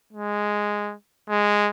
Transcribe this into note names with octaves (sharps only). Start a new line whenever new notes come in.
G#3
G#3